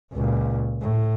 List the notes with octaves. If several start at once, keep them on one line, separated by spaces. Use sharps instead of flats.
C#2 A#2
A2